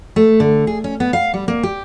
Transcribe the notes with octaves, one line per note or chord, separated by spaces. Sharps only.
A3
D3
G#4
C#4
B3
F5
G3
A#3
G4